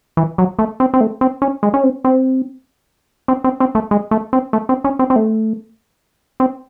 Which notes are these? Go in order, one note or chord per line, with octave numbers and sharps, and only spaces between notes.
E3
F#3
A3
C4
C4
A3
C4
C#4
G#3
C#4
C4
C4
C4
C4
C4
A3
G#3
A3
C4
A3
C4
C#4
C4
C4
A3
C4